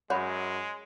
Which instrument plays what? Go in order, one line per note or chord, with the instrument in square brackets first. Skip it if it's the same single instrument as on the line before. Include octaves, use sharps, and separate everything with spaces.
[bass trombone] F#2 [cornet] G#3 [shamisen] F#4 [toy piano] C#5 B5